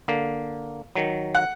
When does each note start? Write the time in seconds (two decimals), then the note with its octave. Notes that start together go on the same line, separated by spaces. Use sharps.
0.08 D3 A#3
0.95 D#3 F#3
1.35 F#5